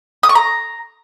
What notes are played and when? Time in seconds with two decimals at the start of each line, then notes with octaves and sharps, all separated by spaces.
0.23 D#6
0.29 C#6
0.35 A#5